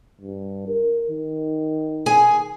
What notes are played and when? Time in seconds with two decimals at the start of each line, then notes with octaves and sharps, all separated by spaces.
0.21 G2
0.68 A#4
1.10 D#3
2.06 G#4 G#5